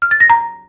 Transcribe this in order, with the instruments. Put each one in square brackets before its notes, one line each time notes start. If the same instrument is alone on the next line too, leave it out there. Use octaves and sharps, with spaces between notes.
[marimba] F6
A6
A#6
A#5